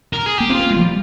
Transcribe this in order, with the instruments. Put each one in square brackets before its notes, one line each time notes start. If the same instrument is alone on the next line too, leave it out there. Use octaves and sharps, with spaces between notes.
[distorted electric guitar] A#4
G#4
[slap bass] A#3 [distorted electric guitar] G4
[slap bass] C4 [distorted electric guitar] F4
[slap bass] A#3
G#3
F3
G3